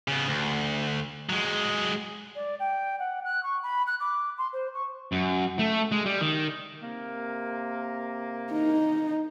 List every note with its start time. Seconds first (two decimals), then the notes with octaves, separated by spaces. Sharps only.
0.08 C#3 B3
0.28 D2
1.30 F#3 G#3
2.35 D5
2.59 G5
2.99 F#5
3.25 F#6
3.43 C#6
3.63 B5
3.87 F#6
4.00 D6
4.38 C6
4.53 C5
4.74 C#6
5.12 F#2
5.59 A3
5.92 G#3
6.06 G3
6.21 D#3
6.82 C3 A#3
8.52 D#4